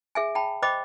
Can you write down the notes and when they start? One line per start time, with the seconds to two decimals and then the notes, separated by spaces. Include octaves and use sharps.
0.15 G#4 E5 G#5
0.35 G5 A5 B5
0.62 C5 D#5 G5 B5 D6